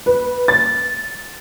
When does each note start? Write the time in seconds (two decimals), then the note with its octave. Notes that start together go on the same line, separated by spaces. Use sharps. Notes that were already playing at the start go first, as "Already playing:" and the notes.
0.06 B4
0.48 A6